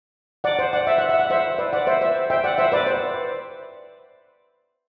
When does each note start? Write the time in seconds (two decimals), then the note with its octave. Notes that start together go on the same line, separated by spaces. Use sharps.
0.44 D5 F#5
0.59 C5
0.73 D5 F#5
0.87 E5
0.98 F#5
1.09 E5
1.20 F#5
1.30 C5 E5
1.58 B4 D5
1.73 D5 F#5
1.87 C5 E5
2.01 C5 E5
2.30 E5 G5
2.44 D5 F#5
2.58 C5 E5
2.72 B4 D5
2.87 C5